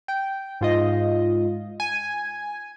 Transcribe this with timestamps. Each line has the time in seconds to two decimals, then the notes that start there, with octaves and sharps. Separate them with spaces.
0.08 G5
0.61 G#2 F4 D#5
1.80 G#5